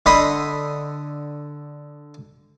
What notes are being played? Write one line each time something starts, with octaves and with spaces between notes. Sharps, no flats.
D3 D#5 B5 C6 D#6